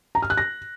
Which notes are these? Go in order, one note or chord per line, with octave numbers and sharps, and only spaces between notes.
A#5
F6
F#6
A#6